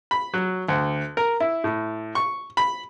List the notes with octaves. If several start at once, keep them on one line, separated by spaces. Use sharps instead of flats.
B5
F#3
D2
A#4
E4
A2
C#6
B5